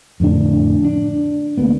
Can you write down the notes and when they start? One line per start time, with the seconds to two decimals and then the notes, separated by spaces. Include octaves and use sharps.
0.20 F2 A2 D3 D4
0.85 D4
1.57 D2 A#3 B3